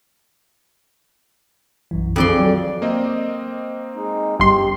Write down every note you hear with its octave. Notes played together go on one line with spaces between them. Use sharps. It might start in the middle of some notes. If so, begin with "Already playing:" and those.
B1 F#2 E3
F2 D3 D#3 C4 D5 C6
G#4
F#3
A#3 C4 D#5
G#3 D#4
G1 G4 C6